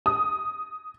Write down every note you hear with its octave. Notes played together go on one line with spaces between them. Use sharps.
D#6